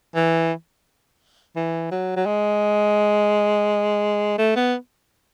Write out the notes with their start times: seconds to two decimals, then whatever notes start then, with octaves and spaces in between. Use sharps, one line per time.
0.15 E3
1.56 E3
1.92 F#3
2.16 F#3
2.26 G#3
4.38 A3
4.56 B3